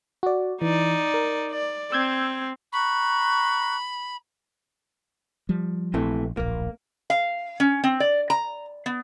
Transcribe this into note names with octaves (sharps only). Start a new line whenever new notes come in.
F#4 D5
E3 D#4 D5
A#4
D5
C4 E6 G6 G#6
A#5 B5 C#6 F#6
F3 G3
A#1 C3 E3 A3
D1 A#1 A#3
F5
C#4
C4
D5
A#5
B3